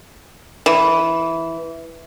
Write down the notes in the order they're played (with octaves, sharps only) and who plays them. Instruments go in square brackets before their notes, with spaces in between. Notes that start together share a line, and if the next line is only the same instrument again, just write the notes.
[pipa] E3